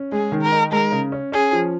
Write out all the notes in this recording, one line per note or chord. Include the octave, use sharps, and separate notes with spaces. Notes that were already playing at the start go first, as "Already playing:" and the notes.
Already playing: C#4
G#3 G#4
D#3
A#4
D#4
G#3 A#4
C#3
C#4
C#4 G#4
F3